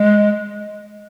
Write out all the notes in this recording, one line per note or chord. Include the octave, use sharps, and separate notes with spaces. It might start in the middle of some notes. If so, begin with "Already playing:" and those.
Already playing: G#3